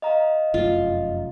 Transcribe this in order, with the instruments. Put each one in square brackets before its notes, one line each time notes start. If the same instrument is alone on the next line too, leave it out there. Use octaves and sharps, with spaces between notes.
[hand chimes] D#5 F5 A#5
[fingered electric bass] F1 F#2 [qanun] F4